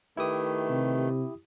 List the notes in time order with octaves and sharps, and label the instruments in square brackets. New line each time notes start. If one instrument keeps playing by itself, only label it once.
[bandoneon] D#3 A3 [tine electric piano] E4 G4 D#6 [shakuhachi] B4
[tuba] C3